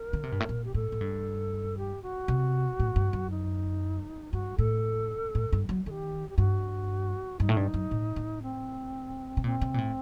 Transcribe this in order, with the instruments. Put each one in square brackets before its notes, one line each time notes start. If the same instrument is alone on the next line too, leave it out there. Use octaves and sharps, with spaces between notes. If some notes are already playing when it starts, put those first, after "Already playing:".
Already playing: [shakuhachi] A#4
[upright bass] D3
C3
G2
A2
A#2
[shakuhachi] G4
[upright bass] A2 [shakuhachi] A4
[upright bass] A2
G2
[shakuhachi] G4
F#4
[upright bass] C3
A2
G2
F#2
[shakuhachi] D#4
[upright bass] G2 [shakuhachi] F#4
[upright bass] A2 [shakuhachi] A4
[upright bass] A2
G2
F#3
[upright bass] D#3 [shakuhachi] A4
[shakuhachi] G4
G4
[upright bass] G2 [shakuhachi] F#4
[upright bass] G2 [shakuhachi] D#4
[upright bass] A2
G2
F#2
A2
A2
[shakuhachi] C4
[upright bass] C3
[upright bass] A#2 [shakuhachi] C4
[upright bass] C3
A#2
A2